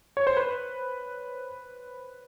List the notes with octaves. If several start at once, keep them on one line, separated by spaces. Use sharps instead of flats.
C#5
C5
B4